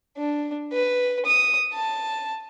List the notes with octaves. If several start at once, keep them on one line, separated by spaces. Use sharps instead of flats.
D4
B4
D#6
A5